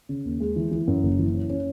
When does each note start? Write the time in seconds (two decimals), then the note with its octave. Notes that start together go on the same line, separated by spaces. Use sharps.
0.09 C#3
0.25 D#2
0.40 G#3
0.56 E3
0.71 E3
0.87 F#2
1.03 F#1
1.19 E3
1.34 C#4
1.50 C#4